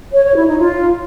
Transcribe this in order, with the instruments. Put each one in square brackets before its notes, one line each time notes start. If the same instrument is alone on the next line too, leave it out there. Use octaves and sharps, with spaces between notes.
[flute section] C#5
C#5
E4
D#4
F4